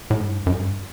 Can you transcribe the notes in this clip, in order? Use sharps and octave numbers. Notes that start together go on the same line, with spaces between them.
A2
G2
F#2
G2